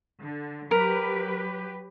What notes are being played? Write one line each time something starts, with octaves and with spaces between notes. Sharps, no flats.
D3
F#3 G4 A#4 B4